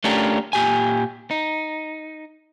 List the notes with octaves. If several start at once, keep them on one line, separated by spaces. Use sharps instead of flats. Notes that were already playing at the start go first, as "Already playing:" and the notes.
A3 C#4 D4 F4 G4 A#4
A#2 G4 G#5
D#4